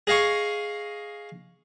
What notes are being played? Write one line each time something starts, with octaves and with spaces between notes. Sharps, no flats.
G#4 D#5 F5 G#5 C#6